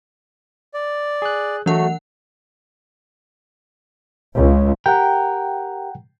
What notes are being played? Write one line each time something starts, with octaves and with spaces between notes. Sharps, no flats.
D5
G#4 F#6
E3 F#3 A3 F#4 F#5
C#2
G4 A#4 F#5 G5